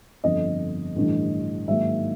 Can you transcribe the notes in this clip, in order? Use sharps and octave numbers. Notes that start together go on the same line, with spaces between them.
G1 F2 D3 F3 D#5
A1 G2 D3
G#2 D#3 F#3 A#3 E5